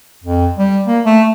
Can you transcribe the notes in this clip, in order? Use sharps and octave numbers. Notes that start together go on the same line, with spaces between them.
F2
G3
A#3
A3